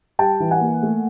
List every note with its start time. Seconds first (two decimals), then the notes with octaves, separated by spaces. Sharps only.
0.19 G3 G5 A5
0.40 E3
0.51 F#5 G#5
0.61 A#3
0.83 A3